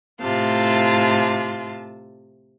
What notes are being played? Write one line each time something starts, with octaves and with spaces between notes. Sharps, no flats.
A2 C3 F4 A5